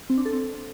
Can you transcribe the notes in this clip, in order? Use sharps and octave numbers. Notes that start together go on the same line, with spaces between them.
C4
D4
A4
C4